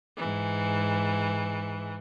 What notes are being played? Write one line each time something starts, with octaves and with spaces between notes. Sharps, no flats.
G#2 E3